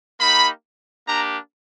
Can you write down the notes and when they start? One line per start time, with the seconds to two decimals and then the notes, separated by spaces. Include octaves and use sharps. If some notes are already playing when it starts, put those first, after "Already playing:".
0.20 A#3 D#4 G4 B5
1.07 A#3 D4 G4 A#5